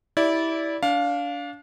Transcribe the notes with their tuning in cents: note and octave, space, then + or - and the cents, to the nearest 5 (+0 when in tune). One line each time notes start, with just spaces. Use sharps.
E4 -15 G4 +0 D5 -20
D4 -30 F5 +10